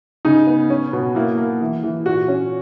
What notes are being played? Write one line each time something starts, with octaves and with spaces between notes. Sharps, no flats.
C#3 D#4
B3
C#4
B2
A#3 E4
A#3
E3
E3
A#2 F#4
C#4